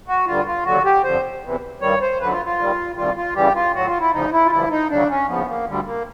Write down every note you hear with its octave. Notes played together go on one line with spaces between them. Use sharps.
F#4
G2 D3 G3 F4
F4
D#2 D3 F#3 F#4
G4
F2 D3 F3 C5
E2 C3 E3
G2 D#3 G3 C#5
C5
F#2 D3 F#3 B4
F4
F4
D#2 D#3 G3
D2 C3 D#3 G3 F4
F4
F#2 C#3 E3 G3 G4
F4
A2 F#3 F#4
F4
E4
D2 C#3 F3 D#4
E4
F4
G2 D3 F3 E4
D#4
D2 C#3 F#3 D4
C#4
D#2 C#3 F3 B3
A#3
D2 D3 G3
A#3